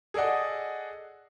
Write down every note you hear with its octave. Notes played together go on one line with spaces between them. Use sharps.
G#4 A4 D5 D#5 F#5